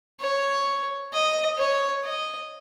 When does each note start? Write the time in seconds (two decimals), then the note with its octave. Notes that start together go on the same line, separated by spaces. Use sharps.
0.20 C#5
1.13 D#5
1.58 C#5
2.04 D#5